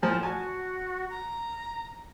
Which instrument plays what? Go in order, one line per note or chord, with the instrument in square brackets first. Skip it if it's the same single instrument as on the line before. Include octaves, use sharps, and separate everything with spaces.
[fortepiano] A2 F3 [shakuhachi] G#5
[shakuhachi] F#4 [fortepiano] G#5 A5
[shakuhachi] A#5